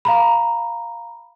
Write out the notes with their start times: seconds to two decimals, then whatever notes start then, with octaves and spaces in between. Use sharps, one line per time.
0.05 F5 A#5 B5